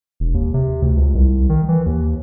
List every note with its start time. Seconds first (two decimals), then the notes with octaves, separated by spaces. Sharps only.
0.20 E1
0.34 D#2
0.54 C3
0.82 D2
0.96 C#2
1.15 C2
1.49 D#3
1.69 E3
1.86 D#2